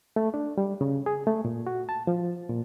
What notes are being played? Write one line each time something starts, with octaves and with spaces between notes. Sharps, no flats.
A3
D4
G3
C#3
G#4
A3
A#2
F#4
A5
F3
A#2